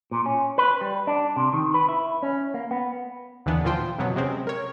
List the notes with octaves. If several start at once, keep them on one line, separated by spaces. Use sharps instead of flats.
A#2
C#4
B4
G3
D4
C3
D#3
B4
E4
C#4
A#3
B3
D#2 D3 E3 B3 D4
A#2 E3 F3 F4 C5 G5
F2 B2 F#3 B3
C3 G#3 C4 C#4
A#4 C#5